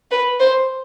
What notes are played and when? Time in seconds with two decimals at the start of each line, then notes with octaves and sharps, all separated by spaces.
0.11 B4
0.40 C5